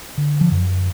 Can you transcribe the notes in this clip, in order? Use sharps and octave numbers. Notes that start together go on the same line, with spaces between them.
D3
F3
F#2